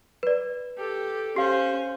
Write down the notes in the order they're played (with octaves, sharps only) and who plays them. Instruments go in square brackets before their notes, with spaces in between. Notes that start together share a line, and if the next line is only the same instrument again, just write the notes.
[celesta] B4 D5
[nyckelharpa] G4 A4
[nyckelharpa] C#4 C5 [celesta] G4 F5